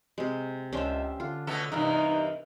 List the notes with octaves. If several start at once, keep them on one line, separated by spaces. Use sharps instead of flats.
C3 G#3
C#2 C#4 D4 G4 C5 E5 G5
D3 F4
B2 A3 C#4 D4 A4
G2 C3 E3 D#4 A#4 D#5